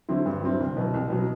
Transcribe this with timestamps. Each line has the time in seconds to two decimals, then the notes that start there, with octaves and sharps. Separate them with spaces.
0.09 D3 F#3 C4 E4
0.26 G2
0.43 D3 F#3 C4 E4
0.60 C2
0.77 B2 F#3
0.94 C2
1.10 B2 F#3